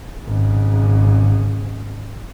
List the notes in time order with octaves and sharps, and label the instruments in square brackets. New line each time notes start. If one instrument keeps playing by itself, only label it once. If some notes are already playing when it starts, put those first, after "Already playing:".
[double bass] G#1 C#3